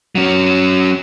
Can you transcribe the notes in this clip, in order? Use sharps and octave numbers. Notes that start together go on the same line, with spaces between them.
F#3 C#4